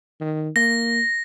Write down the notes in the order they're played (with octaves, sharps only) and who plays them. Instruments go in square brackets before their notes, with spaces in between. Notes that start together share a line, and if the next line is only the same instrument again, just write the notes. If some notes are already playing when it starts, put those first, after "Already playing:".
[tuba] D#3
[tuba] A#3 [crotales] A#6